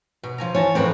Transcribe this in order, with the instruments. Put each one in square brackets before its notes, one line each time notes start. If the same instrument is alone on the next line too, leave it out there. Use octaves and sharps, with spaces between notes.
[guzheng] B2
F3 G#5 A#5
[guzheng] E3 A5 A#5 [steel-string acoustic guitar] C#5
[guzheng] F2 A2 F#4 [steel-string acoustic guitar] C4 A#4 B4